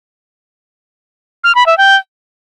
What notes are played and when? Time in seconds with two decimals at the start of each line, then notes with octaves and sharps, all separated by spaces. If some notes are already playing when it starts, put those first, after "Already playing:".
1.44 F6
1.55 B5
1.66 E5
1.78 G5